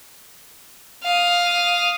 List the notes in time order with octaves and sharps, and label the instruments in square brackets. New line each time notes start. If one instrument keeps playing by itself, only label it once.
[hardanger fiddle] F5 D#6